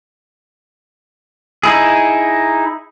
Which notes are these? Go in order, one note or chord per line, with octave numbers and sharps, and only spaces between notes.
D#4 E4 G#4